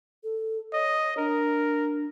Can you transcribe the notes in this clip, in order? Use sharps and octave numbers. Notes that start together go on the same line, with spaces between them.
A4
C#5 D#5
D4 A#4